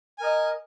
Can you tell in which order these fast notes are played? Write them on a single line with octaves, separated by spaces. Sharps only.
G#5 A#4 D#5